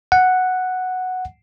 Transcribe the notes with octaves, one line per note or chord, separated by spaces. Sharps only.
F#5